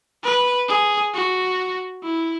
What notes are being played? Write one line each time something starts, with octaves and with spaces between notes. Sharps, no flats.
B4
G#4
F#4
E4